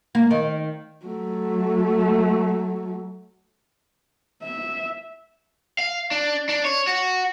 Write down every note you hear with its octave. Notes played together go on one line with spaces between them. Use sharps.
A#3
D#3
F#3 A3
E5
F5
D4
D4
C#5
F#4